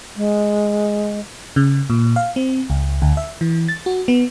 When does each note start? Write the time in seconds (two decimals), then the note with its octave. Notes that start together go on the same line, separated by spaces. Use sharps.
0.16 G#3
1.56 C#3
1.90 A#2
2.16 F5
2.36 C4
2.70 C#2
3.02 D2
3.17 E5
3.41 E3
3.68 A6
3.86 F#4
4.08 B3